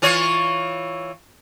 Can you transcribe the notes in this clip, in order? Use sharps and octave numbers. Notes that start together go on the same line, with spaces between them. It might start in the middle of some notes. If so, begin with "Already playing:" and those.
E3 F4 C#5